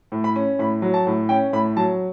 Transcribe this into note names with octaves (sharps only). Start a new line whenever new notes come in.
A2
B5
C#4
A2 B5
F#3
A5
A2
C#4 G5
A2 B5
F#3 A5